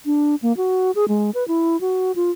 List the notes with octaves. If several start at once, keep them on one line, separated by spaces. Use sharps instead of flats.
D4
A#3
F#4
G#4
G#3
B4
E4
F#4
F4